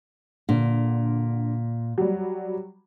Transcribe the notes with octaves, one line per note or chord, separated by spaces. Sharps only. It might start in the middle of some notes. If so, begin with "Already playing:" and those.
A#2 D3
F#3 G3